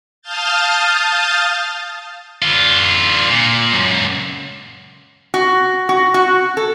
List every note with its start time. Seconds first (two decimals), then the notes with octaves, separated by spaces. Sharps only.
0.22 F5 A5 D#6 F6 G6 A6
2.42 D3 F4
3.30 A#2
3.73 C#2 F#2
5.34 F#4
5.89 F#4
6.14 F#4
6.57 A4